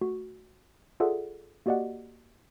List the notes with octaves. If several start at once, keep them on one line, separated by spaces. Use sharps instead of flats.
A3 F#4
F4 G#4 A4 D5 E5 F#5
A#3 F#4 G4 D5 D#5 F#5